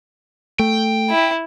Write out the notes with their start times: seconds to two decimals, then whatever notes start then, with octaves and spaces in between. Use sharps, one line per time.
0.59 A3 G5
1.10 E4